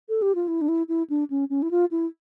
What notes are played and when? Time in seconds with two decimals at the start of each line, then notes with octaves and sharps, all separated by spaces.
0.09 A4
0.22 G4
0.35 F4
0.48 E4
0.61 D4
0.68 E4
0.88 E4
1.10 D4
1.30 C#4
1.50 C#4
1.62 E4
1.71 F4
1.91 E4